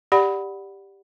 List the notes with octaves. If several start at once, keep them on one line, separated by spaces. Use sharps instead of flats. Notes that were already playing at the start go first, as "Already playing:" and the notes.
G4 D5 F#5 B5